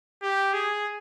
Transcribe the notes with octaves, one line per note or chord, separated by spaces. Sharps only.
G4
G#4